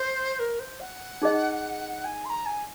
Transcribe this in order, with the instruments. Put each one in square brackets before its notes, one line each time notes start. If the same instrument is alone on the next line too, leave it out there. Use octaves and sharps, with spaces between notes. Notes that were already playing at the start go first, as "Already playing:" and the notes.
Already playing: [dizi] C5
A#4
C5
F#5
[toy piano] D#4 G#4 D#5
[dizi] G#5
C6
A#5
G#5